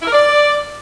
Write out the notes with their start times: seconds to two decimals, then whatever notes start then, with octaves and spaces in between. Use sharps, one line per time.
0.02 E4
0.08 A#4
0.13 D5